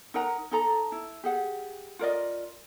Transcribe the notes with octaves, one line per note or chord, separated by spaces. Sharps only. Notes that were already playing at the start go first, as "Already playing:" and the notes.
D#4 A#4 F#5 A#5
D#4 A4 A#5
E4
G4 G#4 F#5
F4 A#4 D5 D#5